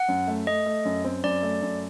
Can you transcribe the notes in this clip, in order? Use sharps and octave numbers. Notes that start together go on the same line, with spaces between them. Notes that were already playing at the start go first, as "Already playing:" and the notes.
Already playing: F#5
F#2
A3
A3 D#5
A3
F#2
C4
F#2 D5
A3
F#2